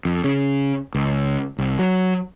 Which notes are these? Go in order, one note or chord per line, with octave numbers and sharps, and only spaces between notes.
F2
C#3
C#2
C2
F#3